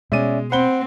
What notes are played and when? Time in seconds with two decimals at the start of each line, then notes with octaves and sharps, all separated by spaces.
0.12 B2 G#3 C#4 D5 E5 D#7
0.52 C4 C5 F#5 B5 G7